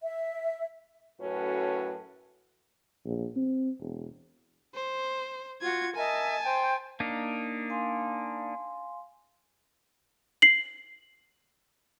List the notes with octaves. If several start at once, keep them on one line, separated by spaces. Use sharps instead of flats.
E5
F#2 A2 C#4 F#4 A4 B4
A#1
C4
E1
C5
F4 F#4 G#6
A#4 D#5 E5 G#5 A5
C5 G5
A#3 D4 D#4
F5 G#5 C6
C7 F#7